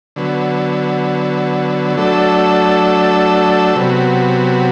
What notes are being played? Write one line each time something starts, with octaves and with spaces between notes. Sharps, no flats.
D3 F#3 B3
F#3 A3 D4 A4
C3 F#3 B3